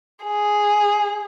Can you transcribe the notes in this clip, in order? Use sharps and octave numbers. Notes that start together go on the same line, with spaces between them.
G#4